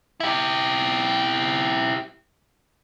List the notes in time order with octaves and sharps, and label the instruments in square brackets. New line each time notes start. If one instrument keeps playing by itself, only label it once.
[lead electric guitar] E4 G4